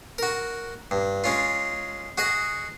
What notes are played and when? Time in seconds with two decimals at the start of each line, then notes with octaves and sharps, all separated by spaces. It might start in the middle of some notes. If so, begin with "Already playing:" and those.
0.18 F#4 A#4
0.91 G2
1.24 G#3 C#4 F4
2.18 F#4 G#4 D#5 F#5